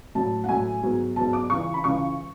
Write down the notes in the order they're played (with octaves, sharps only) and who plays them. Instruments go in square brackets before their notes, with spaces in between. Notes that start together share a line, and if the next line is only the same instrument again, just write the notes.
[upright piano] A2 F#3 A3 A5
F#5
A2 F#3 A3 G#5
G#2 F#3 B3
G#2 F#3 B3 A5
D6
C#2 C#3 E3 C#6
B5
C#2 C#3 E3 C#6